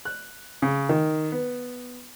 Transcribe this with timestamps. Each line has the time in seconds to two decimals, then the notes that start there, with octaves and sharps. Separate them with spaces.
0.05 F#6
0.62 C#3
0.89 D#3
1.32 B3